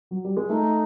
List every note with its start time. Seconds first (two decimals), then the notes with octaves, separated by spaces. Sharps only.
0.11 F#3
0.24 G3
0.37 G#3
0.49 A3 D#4